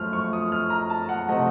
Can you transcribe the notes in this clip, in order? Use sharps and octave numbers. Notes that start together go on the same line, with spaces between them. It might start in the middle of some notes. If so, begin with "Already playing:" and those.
Already playing: F#2 F3 A3 F6
C#6
D#6
F6
A#5
A5
F#5
C3 F3 A3 D#5